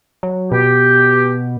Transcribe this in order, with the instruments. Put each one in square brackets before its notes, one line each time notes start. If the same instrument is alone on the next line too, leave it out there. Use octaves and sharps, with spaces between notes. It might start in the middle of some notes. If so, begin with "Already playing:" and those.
[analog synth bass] F#3
[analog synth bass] B2 [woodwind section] G4